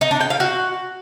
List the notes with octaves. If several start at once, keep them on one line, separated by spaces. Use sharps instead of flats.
D#4
D4
G5
F5
F#4